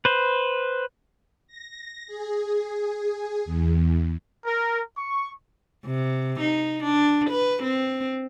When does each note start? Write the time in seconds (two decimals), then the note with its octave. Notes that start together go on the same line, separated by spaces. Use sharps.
0.05 B4 C5
1.47 A#6
2.07 G#4
3.45 E2
4.45 A#4
4.97 C#6
5.85 C3
6.40 D#4
6.84 D4
7.30 B4
7.63 C4